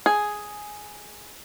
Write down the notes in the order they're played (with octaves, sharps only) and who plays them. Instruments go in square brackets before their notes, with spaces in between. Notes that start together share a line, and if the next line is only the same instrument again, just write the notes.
[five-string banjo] G#4